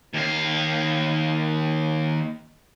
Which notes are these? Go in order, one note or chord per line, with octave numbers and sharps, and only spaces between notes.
D#2 F5